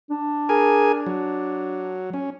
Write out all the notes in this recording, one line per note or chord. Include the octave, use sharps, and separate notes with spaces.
D4
G#4 A#4 G#5
F#3
C#4